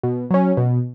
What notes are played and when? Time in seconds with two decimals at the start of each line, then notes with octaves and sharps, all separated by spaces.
0.03 B2
0.30 F#3 C#4
0.57 B2